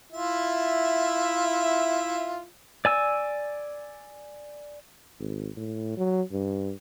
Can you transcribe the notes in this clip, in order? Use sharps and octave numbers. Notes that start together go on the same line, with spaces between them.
E4 F4 E5
D5 G#5 E6
G#1
A2
F#3
G2